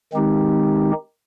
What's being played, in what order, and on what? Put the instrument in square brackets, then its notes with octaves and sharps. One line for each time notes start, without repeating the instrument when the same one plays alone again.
[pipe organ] D#3 G#3 C4 D#4 G4